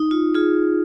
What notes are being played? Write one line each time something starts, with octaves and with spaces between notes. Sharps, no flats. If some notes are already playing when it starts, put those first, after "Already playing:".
Already playing: D#4
F4
F4 G#4